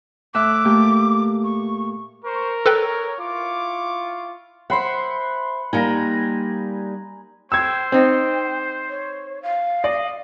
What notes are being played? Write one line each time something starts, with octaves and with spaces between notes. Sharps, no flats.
A2 E5 D6 F#6
A#2 A3 G4
C#6
A#4 C5 C#6
A4 B4 C#5 G5
E4 F4 C#6 D6
C5 E5 F#5 B5 C6
G3 A#3 D#4 G#5 A#5
C5 G5 E6 G#6
C4 D#4 G5
C#5
F5
D5 D#5